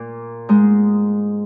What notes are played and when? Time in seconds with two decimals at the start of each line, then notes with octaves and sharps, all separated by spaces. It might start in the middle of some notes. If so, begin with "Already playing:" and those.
Already playing: A#2 A#3
0.49 G#2 G#3